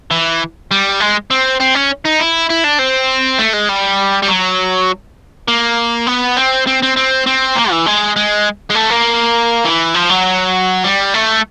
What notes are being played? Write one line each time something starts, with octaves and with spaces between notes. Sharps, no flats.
E3
G3
G#3
C4
C4
C#4
D#4
E4
E4
D4
C4
A3
G#3
G3
G3
F#3
A#3
B3
C4
C4
C4
C4
C4
A#3
E3
G#3
G#3
G#3
A3
A#3
E3
F3
F#3
G3
A3